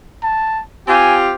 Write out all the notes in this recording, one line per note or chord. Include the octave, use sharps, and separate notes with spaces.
A5
C4 F4 G4 G#5